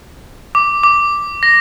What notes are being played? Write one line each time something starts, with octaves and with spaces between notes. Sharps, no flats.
D6
D6
A#6